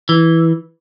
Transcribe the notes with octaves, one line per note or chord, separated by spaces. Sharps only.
E3